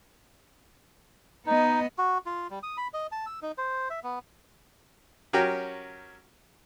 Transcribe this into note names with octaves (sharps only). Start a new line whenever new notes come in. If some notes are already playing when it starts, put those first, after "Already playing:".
B3 D#4 D#5
F#4
F4
G3
D#6
B5
D#5
A5
E6
D#4
C5
E5
B3
F#3 C#4 G4 A#4 G5